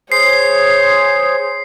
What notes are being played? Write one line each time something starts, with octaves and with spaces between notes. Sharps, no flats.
G#4 C5 C#5 C7